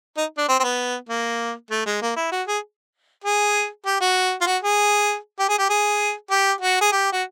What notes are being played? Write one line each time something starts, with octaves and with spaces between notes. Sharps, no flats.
D#4
D4
C4
C4
B3
A#3
A3
G#3
A#3
E4
F#4
G#4
G#4
G4
F#4
F4
F#4
G#4
G4
G#4
G4
G#4
G4
F#4
G#4
G4
F#4